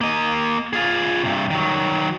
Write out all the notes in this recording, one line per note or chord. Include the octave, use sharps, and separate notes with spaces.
A#3 D#5
F4 G#4
G2 C3
D#3 F#3